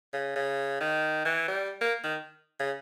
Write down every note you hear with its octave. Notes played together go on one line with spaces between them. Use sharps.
C#3
C#3
D#3
E3
G3
A#3
D#3
C#3